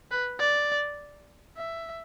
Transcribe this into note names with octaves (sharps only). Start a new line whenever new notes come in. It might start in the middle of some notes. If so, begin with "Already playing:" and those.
B4
D5
E5